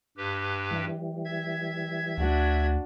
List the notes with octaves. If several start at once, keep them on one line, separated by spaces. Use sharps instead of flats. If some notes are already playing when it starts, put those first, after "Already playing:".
G2 G4 B4
E3 G3
E5 G#6
D2 D4 F#4